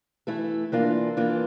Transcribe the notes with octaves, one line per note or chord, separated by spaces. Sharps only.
E3 A3 E4 A4
E3 A#3 D4 F4
E3 A#3 D4 F4